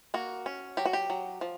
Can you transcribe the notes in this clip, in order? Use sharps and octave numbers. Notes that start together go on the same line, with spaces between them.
A#3 F#4
C#4
F#3 G4
F#4
G4
F#3
F3